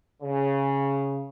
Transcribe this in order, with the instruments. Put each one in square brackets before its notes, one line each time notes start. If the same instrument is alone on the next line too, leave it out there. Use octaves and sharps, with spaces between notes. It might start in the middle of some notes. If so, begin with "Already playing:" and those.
[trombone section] C#3